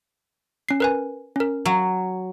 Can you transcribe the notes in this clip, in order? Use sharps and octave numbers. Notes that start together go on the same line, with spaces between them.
C#4 C7
A#4 B4 G#5
C#4 A#4
F#3